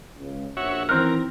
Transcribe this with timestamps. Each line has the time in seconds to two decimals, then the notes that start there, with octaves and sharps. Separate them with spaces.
0.18 C#2
0.57 A#1 F#4 C#5 E5
0.89 D#3 E3 C4 A#4 F6 F#6